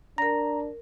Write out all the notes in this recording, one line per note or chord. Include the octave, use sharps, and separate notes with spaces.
D4 A#4 A#5 A#6